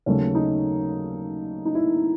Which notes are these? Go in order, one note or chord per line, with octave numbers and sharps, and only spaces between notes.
D#2 C#3 F#3 A3 C#4
D#4
D#4
E4